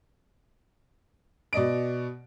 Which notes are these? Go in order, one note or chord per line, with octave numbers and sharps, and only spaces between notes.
B2 D5 D#5 D7